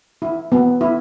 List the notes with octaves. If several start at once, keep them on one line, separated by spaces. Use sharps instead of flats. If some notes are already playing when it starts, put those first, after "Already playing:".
E4
B3
E4